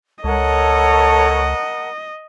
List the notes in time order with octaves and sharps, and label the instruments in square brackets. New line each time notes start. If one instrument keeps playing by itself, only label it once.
[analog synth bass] C#2 [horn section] A4 C#5 [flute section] A#4 F#5 A5 [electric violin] D#5